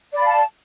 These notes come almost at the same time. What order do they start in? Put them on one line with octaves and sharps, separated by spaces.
D5 B5 F5 A5